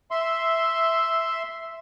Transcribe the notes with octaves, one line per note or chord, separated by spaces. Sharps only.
E5 C6